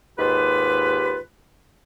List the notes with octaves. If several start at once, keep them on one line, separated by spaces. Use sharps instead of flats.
D#2 G#2 F4 G4 B4